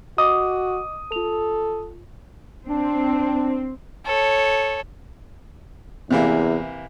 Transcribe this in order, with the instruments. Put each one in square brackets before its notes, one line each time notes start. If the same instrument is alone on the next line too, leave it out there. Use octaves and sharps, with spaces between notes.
[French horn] F#4 [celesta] D#5 D6 [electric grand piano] D#6
[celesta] F4 F7 [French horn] A4
[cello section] C4 [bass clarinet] D4
[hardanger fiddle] A4 C#5
[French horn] E2 [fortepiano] C3 E3 A#3